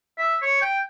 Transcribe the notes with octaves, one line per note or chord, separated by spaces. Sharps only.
E5
C#5
G5